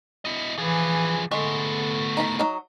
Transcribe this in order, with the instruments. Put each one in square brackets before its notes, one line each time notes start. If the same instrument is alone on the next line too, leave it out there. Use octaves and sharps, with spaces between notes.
[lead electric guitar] E4 D#5
[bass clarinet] E3 [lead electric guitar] F3 G#4
[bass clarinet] D3 [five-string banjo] G#3 [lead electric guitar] A3 B3
[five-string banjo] D#4 A#5 B5
F#3 D#4